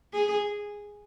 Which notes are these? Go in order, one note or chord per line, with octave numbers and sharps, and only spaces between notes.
G#4